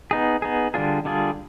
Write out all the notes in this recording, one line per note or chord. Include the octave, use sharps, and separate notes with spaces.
B3 D#4 G#4
B3 D#4 G#4
D3 G3 D4 F4 G#4
D3 G3 D4 F4 G#4